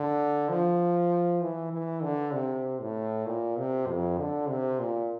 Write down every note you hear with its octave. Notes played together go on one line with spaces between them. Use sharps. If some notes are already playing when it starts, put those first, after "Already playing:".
Already playing: D3
F3
E3
E3
D3
C3
A2
A#2
C3
F2
D3
C3
A#2